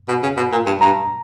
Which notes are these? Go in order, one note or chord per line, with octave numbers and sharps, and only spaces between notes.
B2
C#3
B2
A#2
G2
G2 A#5